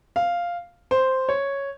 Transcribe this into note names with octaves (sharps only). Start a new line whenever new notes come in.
F5
C5
C#5